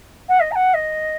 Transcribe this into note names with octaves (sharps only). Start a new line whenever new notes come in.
F#5
D#5
A#5
F#5
D#5